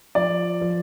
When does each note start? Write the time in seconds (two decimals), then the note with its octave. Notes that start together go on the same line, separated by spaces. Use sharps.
0.15 F3 D5
0.61 F3